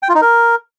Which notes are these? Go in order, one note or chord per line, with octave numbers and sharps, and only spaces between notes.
G5
F4
D#4
A#4